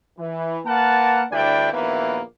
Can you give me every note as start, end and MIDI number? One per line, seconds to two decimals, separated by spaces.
0.19 0.59 52
0.65 1.23 58
0.65 1.23 70
0.65 1.23 71
0.65 1.23 78
0.65 1.23 81
1.32 1.69 38
1.32 1.69 43
1.32 1.69 62
1.32 1.69 64
1.32 1.69 74
1.32 1.69 79
1.73 2.20 34
1.73 2.20 39
1.73 2.20 52
1.73 2.20 58
1.73 2.20 59
1.73 2.20 64